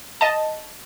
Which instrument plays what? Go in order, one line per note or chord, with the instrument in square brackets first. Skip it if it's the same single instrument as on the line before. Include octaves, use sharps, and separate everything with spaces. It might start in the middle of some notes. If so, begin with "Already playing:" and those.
[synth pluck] D#5 A5